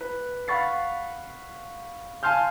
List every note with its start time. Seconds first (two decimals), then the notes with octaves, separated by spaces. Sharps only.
0.01 B4
0.48 F5 F#5 B5 C#6 A6 C7
2.23 F5 G#5 A5 C6 F6 G6